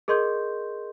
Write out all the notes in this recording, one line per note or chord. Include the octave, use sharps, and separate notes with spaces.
G#4 A#4 D#5 C6 C#6 G6